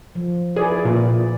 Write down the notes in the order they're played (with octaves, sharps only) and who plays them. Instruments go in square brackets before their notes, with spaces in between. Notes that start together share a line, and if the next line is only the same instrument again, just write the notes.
[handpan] F3
[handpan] E4 B4 D5 [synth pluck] G#4
[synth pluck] A#2